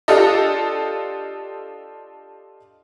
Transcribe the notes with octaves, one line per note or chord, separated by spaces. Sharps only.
D4 F4 G4 A4 D#5